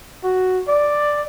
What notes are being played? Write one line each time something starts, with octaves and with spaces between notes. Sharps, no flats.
F#4
D5